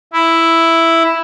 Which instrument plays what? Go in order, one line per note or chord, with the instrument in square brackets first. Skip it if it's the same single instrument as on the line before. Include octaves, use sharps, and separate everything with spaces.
[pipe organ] E4